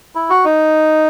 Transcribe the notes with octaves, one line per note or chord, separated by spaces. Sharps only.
E4
F#4
D#4